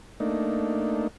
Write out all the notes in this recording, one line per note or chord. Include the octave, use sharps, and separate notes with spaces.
A3 A#3 D4 D#4